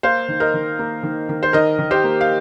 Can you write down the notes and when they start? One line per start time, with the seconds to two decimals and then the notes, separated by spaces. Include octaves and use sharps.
0.03 A#3 C5 F5
0.28 D#3
0.40 A#4 D#5
0.54 D#3
0.79 A#3
1.03 D#3
1.29 D#3
1.43 C5
1.53 D#3 A#4 D#5
1.79 D#3
1.91 G4 C5
2.04 A#3
2.21 F5